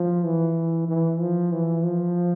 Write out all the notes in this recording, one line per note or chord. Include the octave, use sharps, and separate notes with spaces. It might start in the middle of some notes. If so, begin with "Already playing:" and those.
Already playing: F3
E3
E3
F3
E3
F3